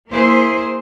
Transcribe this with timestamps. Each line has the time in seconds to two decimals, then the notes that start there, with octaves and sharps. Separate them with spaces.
0.10 A#3 E4 G#4 C5